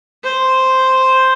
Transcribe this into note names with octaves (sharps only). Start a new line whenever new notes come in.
C5